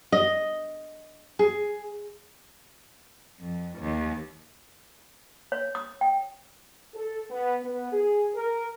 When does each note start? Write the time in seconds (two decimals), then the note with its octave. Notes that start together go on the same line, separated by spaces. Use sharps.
0.12 D#5
1.39 G#4
3.40 F2
3.80 D#2
5.52 C#5
5.75 D#6
6.01 G5
6.95 A4
7.30 B3
7.62 B3
7.92 G#4
8.35 A#4